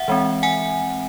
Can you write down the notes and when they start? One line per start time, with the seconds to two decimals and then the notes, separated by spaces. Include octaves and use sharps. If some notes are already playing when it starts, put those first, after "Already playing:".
Already playing: E5 F#5
0.08 E3 G#3 C4
0.43 F#5 G#5